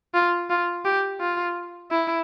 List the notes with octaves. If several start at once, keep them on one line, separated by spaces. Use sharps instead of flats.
F4
F4
G4
F4
E4